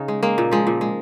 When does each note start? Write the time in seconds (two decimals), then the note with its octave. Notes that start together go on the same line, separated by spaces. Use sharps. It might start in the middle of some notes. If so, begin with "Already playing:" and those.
Already playing: C#3 D#4
0.08 G#3
0.23 G#3 A#3
0.38 A#2
0.51 F3 G#3
0.67 A#2
0.81 G#3